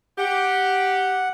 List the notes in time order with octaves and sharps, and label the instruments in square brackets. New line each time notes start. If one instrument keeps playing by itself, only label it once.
[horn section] G4 [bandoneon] F#5